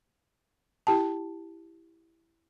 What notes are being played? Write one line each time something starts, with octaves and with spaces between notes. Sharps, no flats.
E4 G4 G5 A5